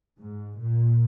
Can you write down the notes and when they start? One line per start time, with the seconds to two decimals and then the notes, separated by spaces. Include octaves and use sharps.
0.18 G#2
0.58 A#2